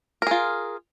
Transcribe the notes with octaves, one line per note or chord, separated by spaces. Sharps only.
F4 G#4 A#4